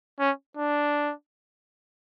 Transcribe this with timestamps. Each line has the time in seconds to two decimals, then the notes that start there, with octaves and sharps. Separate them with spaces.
0.20 C#4
0.57 D4